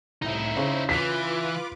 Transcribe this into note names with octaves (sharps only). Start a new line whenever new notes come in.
C2 A2 D#4 E4
C#3 C5
E3 F4 B4 D6 B6